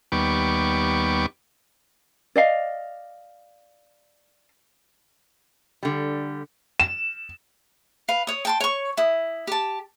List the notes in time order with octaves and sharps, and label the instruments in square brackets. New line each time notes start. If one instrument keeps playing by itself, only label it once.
[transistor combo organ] D#2 G3 B3 C#6 D6
[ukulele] D5 D#5 F5
[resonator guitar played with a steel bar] D3 G3
[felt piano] E7
[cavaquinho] B4 F5
C#5 D#6
G5 A5 C6
C#5 C#6
E4 D#6
G4 A5